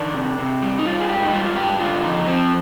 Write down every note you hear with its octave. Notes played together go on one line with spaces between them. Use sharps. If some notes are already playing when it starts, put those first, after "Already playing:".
Already playing: D#3 D4
C3
C3
G3
D#4
G3 F4
G#4
G#2 G4
D#4
G3 F4
F4
G#2 G4
D3 F4
F2 D#4
F2 C4